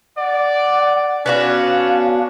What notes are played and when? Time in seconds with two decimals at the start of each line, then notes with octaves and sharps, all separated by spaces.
0.17 D5 F#5
1.26 B3 C#4 D4 F#4 F5